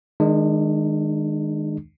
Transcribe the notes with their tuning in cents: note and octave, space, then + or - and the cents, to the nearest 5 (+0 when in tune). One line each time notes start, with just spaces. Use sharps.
D#3 +10 G#3 +10 D4 +40